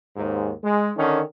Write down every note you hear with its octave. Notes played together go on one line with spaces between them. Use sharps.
D#2 G#2
G#3
D3 D#3 C#4